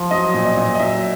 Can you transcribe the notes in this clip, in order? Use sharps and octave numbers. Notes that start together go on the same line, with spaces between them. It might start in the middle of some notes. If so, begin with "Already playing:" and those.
Already playing: F3
F#3 D#5
A#2
D#5
A#2
D#5
F#3 E5